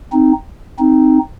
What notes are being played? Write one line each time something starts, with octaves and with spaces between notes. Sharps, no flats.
C4 D#4
C4 D#4